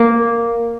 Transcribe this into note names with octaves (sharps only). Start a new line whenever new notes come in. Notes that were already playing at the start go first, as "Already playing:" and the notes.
Already playing: A#3